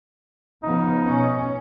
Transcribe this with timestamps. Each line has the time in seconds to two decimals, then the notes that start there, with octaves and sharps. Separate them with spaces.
0.63 C#3 F3 B3 D#4
1.05 B2 C#4